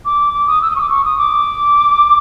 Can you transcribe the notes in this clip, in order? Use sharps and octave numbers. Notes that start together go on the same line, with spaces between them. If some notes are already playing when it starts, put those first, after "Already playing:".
D6
D6
D#6
E6
D#6
C#6
D6
C#6
D#6
D6